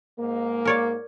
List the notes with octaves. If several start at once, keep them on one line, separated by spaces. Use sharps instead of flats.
G#2 A#3
A#4 C#5 D5